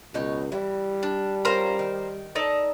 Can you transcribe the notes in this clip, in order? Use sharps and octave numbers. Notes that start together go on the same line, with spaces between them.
C#2 B2 D#4 C#5
E3 G3
D4
C#4 F4 A#4 C5
D#3
D#4 A4 D5 D#5